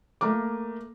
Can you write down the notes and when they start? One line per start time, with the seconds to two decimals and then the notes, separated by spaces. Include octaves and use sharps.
0.21 A3 A#3 A#4 D6